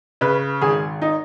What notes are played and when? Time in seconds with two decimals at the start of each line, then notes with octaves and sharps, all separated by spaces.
0.21 C#3 B4
0.61 G#1 G#4
1.02 D#4